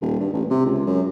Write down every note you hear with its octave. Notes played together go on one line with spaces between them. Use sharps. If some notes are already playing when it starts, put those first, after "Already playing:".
D#1
G2
A1
C3
C#2
F#2